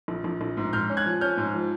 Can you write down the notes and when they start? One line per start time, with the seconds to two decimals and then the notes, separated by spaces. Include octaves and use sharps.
0.08 A#1
0.24 A#1
0.41 A#1
0.57 G#2
0.73 G#2 F6 G6
0.89 C#4
0.97 F#6 G#6
1.06 F3
1.21 C#4 F6 G6
1.37 G#2
1.54 F3